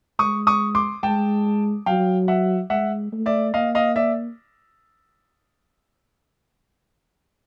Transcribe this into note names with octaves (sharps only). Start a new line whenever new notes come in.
G#3 C#6 D#6
C#6 D#6
C6 D6
G#3 G5 A5
F#3 F5 G5
E5 F#5
G#3 E5 F#5
A3
D5 E5
A#3 D#5 F5
D#5 F5
D5 E5